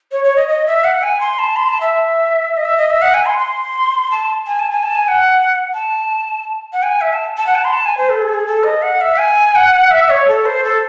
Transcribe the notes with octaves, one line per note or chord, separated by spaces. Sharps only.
C#5
C#5
D#5
D#5
E5
F#5
G#5
C6
A5
C6
A5
E5
D#5
E5
D#5
E5
F#5
G#5
C6
C6
A5
G#5
A5
G#5
A5
G#5
F#5
A5
F#5
G#5
E5
A5
A5
F#5
A5
C6
A5
G#5
C5
A4
G#4
A4
G#4
A4
D#5
F#5
E5
G#5
F#5
E5
C#5
A4
C5
A4